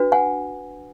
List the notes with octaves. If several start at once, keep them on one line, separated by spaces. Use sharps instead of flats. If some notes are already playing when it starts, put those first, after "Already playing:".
Already playing: D4 F#4 B4
F#5 G#5